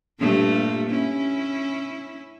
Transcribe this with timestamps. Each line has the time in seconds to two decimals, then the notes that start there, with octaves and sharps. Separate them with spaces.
0.19 G2 A#2 A3
0.89 C#4 E4